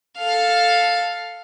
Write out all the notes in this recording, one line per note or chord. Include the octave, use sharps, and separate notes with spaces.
A4 F5